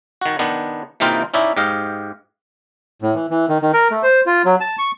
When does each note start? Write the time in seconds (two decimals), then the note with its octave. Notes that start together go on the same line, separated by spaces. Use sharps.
0.21 D#3 F#4
0.39 D#3 B3 D4
1.00 C3 E3 A#3 D#4 F4 G5
1.34 C#4 D#4 E4 D5 E5
1.57 G#2 G4 D#5 F5
3.02 A2
3.15 E3
3.31 E3
3.49 D#3
3.62 D#3
3.73 A#4
3.91 A3
4.03 C5
4.26 F4
4.45 F#3
4.60 A5
4.78 C#6